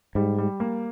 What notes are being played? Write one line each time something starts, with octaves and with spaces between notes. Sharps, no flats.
G#2 G3
G3
A#3